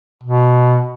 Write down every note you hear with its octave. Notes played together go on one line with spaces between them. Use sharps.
B2